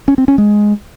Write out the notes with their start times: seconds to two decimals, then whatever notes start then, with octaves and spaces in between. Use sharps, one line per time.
0.08 C#4
0.18 C4
0.28 C#4
0.38 G#3